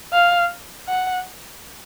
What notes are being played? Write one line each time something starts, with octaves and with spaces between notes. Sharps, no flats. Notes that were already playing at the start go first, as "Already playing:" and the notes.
F5
F#5